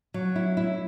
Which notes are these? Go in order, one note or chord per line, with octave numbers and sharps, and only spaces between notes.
F#3
E4
E4